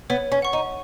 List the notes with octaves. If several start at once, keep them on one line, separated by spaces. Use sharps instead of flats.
B3 C#5
C#4
F#5 C#6
D#4